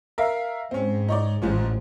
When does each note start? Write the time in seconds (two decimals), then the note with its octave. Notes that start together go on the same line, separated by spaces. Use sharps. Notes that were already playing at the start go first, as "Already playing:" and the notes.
0.18 A#4 E5 F5
0.71 G#2 C4 C#4
1.08 D#4 C#5 D5
1.42 A1 G#2 F3 C#4